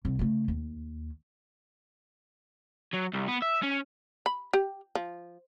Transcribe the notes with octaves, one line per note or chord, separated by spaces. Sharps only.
C2
C#3 A3
D#2
F#3
C2
B3
E5
C#4
B5
G4
F3